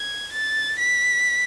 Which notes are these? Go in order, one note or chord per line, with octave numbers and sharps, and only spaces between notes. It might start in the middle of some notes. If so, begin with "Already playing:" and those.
Already playing: G#6
A6
B6